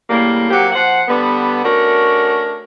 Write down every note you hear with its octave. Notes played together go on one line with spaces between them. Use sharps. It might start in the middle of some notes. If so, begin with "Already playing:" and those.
A2 C#3 G3 A#3
F#3 A#3 C4 G4 F#5
F3 C5 F#5
D3 G3 B3
A3 C#4 D4 F#4 A#4